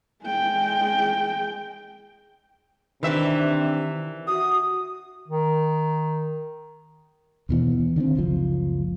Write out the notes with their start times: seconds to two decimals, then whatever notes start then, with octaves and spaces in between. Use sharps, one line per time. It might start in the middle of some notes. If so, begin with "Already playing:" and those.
0.25 G#3 G5
3.03 C3 D#3 E3 C4 D4 E5
4.27 F#4 D#6
5.28 D#3
7.49 D#2 B2 E3 B3
7.96 D3 D#3 A3 C4
8.15 F#1 C#2 F3